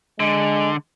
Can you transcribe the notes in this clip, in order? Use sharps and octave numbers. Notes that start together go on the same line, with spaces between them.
D3 G#3